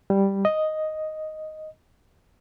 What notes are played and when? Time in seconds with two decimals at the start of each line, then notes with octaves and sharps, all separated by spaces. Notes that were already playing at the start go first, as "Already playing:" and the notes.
0.10 G3
0.45 D#5